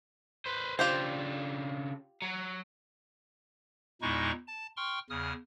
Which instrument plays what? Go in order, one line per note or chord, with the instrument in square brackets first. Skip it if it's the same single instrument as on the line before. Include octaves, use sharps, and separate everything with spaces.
[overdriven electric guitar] B4 C5
[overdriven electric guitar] C#3 D4 [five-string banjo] F4 G4 C5
[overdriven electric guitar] F#3
[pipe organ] E2 A#2 G#3 D#4 E4 C#6
A5
G5 C6 C#6 F6
E2 C#3 D#6 F6